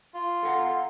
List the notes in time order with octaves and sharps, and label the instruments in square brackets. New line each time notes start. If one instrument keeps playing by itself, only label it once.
[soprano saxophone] F4
[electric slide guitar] A4 F#5 A#5